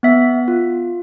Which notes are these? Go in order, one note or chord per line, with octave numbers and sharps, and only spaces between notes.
B3 E5
F4